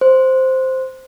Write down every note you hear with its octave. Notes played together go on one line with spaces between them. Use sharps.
C5